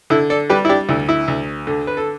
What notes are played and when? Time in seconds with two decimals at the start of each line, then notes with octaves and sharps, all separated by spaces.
0.10 D3 E4
0.30 A4 D5
0.50 G3 G4 B4
0.65 E4
0.69 D4 G4
0.89 D2 E4
1.09 E4
1.28 D2
1.67 D3
1.87 B4
1.97 A4